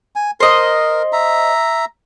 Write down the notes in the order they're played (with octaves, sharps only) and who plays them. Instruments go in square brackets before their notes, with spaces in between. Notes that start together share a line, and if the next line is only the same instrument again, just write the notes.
[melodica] G#5
[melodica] A#4 [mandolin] C5 D#5
[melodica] E5 A#5